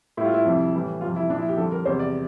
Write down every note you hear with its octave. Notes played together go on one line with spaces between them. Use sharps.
A2 G3 E4 F4
E4
F2 C3 G3
A2 E3 G3
F2 C3 G3 F4
E4
A#2 F3 D4
E4
G4
F2 D3 G3 A4
A#4
E2 C3 G3 C5
D5